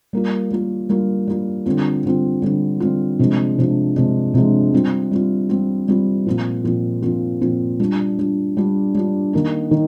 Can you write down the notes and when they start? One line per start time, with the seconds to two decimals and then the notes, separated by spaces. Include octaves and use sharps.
0.13 G3 A#3 F4
0.51 G3 A#3 F4
0.89 G3 A#3 F4
1.27 G3 A#3 F4
1.66 D3 G3 C4 F4
2.04 D3 G3 C4 F4
2.42 D3 G3 C4 F4
2.80 D3 G3 C4 F4
3.19 C3 F3 G#3 D4
3.58 C3 F3 G#3 D4
3.96 C3 F3 G#3 D4
4.34 C3 F3 G#3 D4
4.73 G3 C4 F4
5.11 G3 C4 F4
5.49 G3 C4 F4
5.88 G3 C4 F4
6.26 A#2 F3 C4 F4
6.64 A#2 F3 C4 F4
7.02 A#2 F3 C4 F4
7.41 A#2 F3 C4 F4
7.80 G3 D4 F4
8.19 G3 D4 F4
8.57 G3 D4 F4
8.95 G3 D4 F4
9.33 D#3 A#3 D#4
9.71 D#3